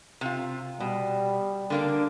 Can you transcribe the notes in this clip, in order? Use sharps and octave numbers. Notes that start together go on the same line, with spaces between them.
C3 F4
B2 G3
D3 A#3 D4